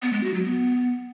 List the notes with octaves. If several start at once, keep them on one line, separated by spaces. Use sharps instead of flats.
B3
G#3
F#4
F#3
B3